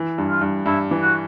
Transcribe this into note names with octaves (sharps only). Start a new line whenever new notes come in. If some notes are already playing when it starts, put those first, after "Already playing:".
Already playing: E3
G2
F4
G2
G2 E4
E3
F#4